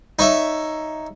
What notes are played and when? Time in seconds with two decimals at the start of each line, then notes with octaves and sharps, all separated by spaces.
0.19 D#4 C#5 E5